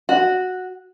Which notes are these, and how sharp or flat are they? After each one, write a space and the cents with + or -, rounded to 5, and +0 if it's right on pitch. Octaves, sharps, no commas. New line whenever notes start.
F#4 -5